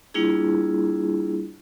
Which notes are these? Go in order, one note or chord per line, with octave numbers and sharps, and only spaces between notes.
G3 A#3 D4 E4 F4 G#4